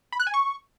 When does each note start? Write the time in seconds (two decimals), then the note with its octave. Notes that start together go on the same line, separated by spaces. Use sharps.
0.12 B5
0.20 F#6
0.27 G#5
0.34 C#6